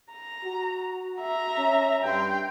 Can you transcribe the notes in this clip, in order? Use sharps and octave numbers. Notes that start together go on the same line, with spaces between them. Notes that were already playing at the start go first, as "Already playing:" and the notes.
A#5
F#4
E5 A#5
C#4
G2 G5 C6